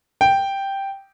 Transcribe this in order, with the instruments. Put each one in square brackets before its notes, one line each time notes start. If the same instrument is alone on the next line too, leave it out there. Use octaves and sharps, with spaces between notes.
[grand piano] G5